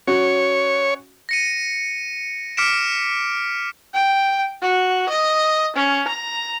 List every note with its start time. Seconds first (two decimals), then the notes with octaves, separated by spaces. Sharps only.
0.07 C#4 F#4 C#5
1.29 A#6 C#7 D#7
2.57 D6 F6 B6 C#7 D7 E7
3.94 G5
4.62 F#4
5.09 D#5
5.76 C#4
6.08 A#5